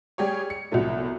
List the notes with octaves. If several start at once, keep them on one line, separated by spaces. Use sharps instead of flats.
G3 G4 G#4 C#5
C#7
C2 B2 F3 F#3 A3